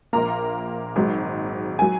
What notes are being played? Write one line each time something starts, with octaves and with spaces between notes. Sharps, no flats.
A#1 A#2 A#3 A#5
G#1 G#2 F#3
F#3 G#5